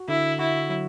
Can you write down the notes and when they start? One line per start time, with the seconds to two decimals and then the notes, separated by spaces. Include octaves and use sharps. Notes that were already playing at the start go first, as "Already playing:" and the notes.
Already playing: F#4
0.08 D3 E4
0.39 E4 F#4
0.69 F#3